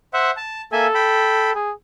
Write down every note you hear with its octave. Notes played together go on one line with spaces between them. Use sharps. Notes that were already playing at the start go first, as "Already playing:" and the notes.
C5 E5 F#5
A5
A#3 A4 E5 G#5
G5 B5
G#4